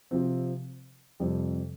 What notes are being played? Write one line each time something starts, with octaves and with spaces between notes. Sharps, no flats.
C3 F3 C4
F2 C3 G3 C4